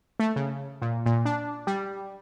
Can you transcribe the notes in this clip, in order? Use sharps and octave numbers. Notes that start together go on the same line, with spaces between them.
A3
C#3
A#2
A#2
D4
G3